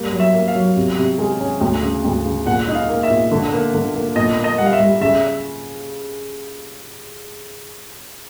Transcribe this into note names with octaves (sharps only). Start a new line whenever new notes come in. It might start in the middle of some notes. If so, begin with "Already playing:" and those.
Already playing: G3 A#3
F#3
E5
A#3
F5
F#3
C3
C3
G#3
C#4
D2
C#3
D2
C#3
A#2 F#5
D#4
F5
A#3
E5
A#2
D3
A#3
D3
A#3
A#2 D#5
A#3
D#5
G3 F#5
F5
E5
G3
C#3 E5